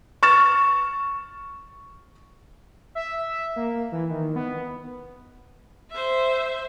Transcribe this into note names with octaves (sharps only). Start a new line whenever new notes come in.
C#6 F6 A6 E7
E5
E5
A#3
E3
D#3
B3
C5 E5